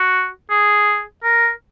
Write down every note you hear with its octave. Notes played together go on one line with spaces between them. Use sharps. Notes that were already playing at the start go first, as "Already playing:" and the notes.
Already playing: F#4
G#4
A#4